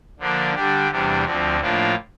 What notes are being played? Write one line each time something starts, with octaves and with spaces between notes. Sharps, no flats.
D3 F3 A#3 D4
D3 G3 D4 G4
E2 C3 G3 D4
D2 D3 F3 C4
A2 F3 A#3 D4 F4